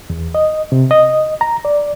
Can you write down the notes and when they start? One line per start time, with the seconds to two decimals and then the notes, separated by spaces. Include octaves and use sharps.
0.10 E2
0.35 D#5
0.72 C3
0.91 D#5
1.41 A#5
1.65 D5